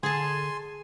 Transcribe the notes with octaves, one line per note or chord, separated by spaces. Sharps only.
D3 G#4 G#5 A5 C6